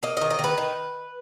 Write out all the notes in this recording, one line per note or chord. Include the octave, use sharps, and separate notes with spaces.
A#3 D#5
D#3 D#5
D#5
D#3 B4
D#3